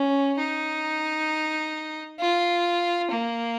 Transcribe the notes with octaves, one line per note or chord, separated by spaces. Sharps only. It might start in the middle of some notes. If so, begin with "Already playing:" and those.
Already playing: C#4
D#4
F4
A#3